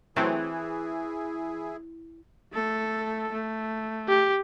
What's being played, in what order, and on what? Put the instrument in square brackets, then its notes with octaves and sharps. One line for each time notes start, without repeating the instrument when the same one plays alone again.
[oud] E3 [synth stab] F#3 A3 C4 [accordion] E4 G#4
[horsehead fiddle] A3 A4
A3
[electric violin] G4